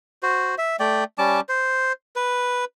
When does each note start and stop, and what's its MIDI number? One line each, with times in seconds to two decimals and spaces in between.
0.23 0.55 66
0.23 0.55 72
0.58 0.76 76
0.80 1.04 57
0.80 1.04 74
0.80 1.04 79
1.18 1.40 55
1.18 1.40 61
1.18 1.40 81
1.18 1.40 86
1.49 1.92 72
2.16 2.65 71